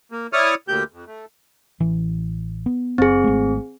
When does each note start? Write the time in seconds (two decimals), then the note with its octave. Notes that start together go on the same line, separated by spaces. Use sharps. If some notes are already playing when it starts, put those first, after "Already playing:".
0.12 A#3
0.33 E4 C#5 D5 C#6 D#6 F6
0.68 D2 A#2 G4 G6
0.93 F2
1.07 A3
1.80 A1 E3
2.66 B3
2.98 F#1 C4 G#4
3.24 G#1 G#3 A3